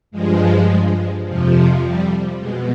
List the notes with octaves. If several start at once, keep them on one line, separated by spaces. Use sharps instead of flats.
G2 F3 G#3
F2 C3 F3
G3
B2 G#3